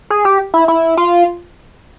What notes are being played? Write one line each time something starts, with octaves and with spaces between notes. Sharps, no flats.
G#4
G4
E4
E4
F4